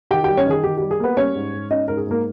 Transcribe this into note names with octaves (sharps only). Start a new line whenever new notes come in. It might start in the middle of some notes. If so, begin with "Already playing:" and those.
D#3 G4 G5
G3 G4 G5
C#4 C#5
D#3 G#4
D#3 G4
G3 G4
G#4
A#3 B3 B4
G3 C#4 C#5
G#2
G#2
C#4 D#4 D#5
G#2 A#4
G#4
G#2 A#3 A#4